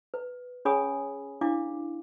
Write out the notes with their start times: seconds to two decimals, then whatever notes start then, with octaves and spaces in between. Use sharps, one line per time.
0.14 B4
0.65 C#4 G#4 C#5 G#5 B5 D#6
1.41 D4 E4 F5 D6